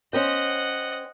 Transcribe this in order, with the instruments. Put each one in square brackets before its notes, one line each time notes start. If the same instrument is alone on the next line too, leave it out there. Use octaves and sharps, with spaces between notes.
[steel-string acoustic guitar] C#4 C5 G5 [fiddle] D#5 F#5